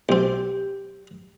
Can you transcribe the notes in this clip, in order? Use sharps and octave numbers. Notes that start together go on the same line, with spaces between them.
B1 C4 G4 D5